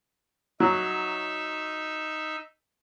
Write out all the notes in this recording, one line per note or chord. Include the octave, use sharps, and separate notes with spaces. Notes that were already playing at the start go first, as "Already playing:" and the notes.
F#3 D#4 E5